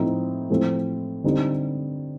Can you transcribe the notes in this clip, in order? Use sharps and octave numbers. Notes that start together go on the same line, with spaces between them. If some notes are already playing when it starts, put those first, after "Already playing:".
Already playing: A2 F3 C4 D#4
A2 F3 A3 C4
D3 G3 C4 D#4